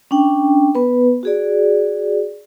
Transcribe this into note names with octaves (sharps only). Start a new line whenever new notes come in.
C#4 D4 G5
B3 B4
F#4 G#4 D5